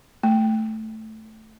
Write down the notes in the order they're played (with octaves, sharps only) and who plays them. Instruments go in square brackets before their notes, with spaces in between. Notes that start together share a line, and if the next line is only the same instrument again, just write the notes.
[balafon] A3